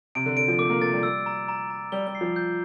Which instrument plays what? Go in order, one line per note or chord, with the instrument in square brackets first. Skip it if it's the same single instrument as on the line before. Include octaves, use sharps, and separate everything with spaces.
[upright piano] C3 [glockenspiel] D7
[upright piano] D3
[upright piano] D3 [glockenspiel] D7
[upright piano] F3
[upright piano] A3 [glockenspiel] D6
[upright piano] A#3
[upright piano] A3 [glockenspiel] A6
[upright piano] G3
[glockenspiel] E6
A#5
A#5
A#5
[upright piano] G3 [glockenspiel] G7
[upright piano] G3
[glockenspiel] C7
[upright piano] F3
[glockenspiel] G6